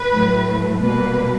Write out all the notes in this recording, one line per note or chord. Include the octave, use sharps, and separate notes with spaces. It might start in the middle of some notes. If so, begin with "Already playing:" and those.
Already playing: B4
A2 F#3 A3
B2 G3 A#3 B4